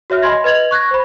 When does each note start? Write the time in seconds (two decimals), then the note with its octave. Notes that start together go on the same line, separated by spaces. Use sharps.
0.10 F#4 C#5 E5 F6
0.22 D#5 G#5 B5 C6 G#6 A#6
0.44 B4 D#5 G#6 F7 F#7
0.71 C#6 F#6 G#6 A#6
0.91 C5 B5